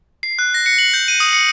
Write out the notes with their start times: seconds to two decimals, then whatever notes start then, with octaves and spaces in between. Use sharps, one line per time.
0.23 C7
0.39 F#6
0.54 A#6
0.66 C#7
0.78 F#7
0.94 G6
1.08 D#7
1.20 D#6
1.33 C#7